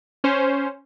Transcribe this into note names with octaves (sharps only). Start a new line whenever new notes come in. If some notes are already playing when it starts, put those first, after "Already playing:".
C#4 C5